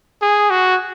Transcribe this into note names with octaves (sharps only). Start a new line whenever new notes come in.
G#4
F#4